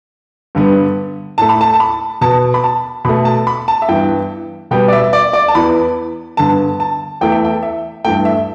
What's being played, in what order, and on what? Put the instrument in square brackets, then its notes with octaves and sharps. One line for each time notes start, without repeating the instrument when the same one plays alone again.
[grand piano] G2 D3 G3 B3
A2 A3 A5
B5
A5
A5
B5
B2 B3 A5
B5
A5
B2 B5
A3
A5
B5
A5
E5
G2 E3 B3 G5
B2 G3 B3 G5
D5
E5
E5
D5
D5
A5
E2 E3 B3 B5
G2 D3 B3 A5
A5
E2 E3 A3 G5
E5
G5
E5
G2 E3 A3 G5
E5